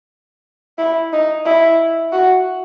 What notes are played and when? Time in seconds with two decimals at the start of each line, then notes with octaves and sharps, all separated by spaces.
0.78 E4
1.12 D#4
1.46 E4
2.12 F#4